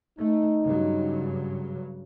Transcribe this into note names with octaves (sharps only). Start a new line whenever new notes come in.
A3 D#4
G2 C#3 F#3